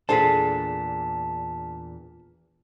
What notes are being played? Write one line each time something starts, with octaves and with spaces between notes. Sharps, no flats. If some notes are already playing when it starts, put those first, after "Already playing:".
E2 A#2 D4 G#4 A4 C5 A5 B6